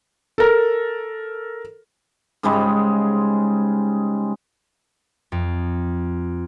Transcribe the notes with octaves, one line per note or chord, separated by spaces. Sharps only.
A4 A#4
G#2 C#3 G3 G#3
F2